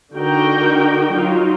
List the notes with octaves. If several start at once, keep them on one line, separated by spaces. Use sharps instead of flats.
D3 D#4 F#4 A#4 G5
F#3 D#4 F4